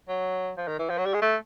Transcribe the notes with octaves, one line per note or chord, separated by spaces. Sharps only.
F#3
F3
D#3
E3
F3
F#3
G3
G#3
A3